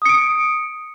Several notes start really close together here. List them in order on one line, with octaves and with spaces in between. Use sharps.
D#6 C#7 D7